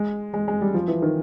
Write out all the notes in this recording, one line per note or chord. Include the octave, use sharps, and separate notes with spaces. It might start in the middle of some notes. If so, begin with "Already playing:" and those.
Already playing: G#3
G#3
G#3
G3
F3
E3
D#3